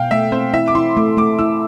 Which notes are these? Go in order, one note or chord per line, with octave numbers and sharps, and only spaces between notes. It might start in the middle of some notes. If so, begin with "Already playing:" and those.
Already playing: B2 F5 G5
A3 E5
C4 C5
E4 E5
D6
E4 C6
A3 D6
A3 D6
E4 E6